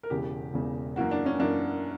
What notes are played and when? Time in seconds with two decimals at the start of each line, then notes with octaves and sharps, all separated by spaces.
0.03 A#4
0.10 E1 E2 C#3 G4
0.54 E1 E2 C#3
0.96 F#2 E3 A#3 F#4
1.11 D4
1.26 C#4
1.39 F#2 E3 A#3 D4